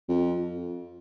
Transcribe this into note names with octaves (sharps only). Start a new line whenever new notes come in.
F2